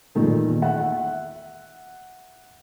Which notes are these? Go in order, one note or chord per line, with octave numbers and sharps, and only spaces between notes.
E2 A#2 D#3 A3
E5 F#5